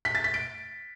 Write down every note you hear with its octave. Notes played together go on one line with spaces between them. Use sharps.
B6
A6
B6
D7